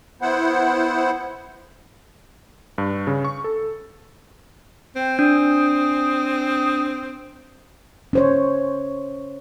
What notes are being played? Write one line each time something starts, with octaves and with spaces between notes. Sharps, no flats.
B3 E4 C5 F#5
G2
C#3
C#6
A4
C4 G5
D4 D#6
C#4 C5 C#5